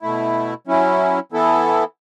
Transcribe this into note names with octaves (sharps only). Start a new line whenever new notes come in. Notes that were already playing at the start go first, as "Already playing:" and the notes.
B2 A3 E4
F#3 C#4 E4
E3 B3 E4 A4